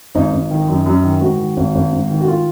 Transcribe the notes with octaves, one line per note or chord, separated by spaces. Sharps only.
G#1 D#4
G#1
D#3
F#2
F#2
D#3
G#2 F#4
D#3
G#1
G#1
G#2
D#3
F#4
F4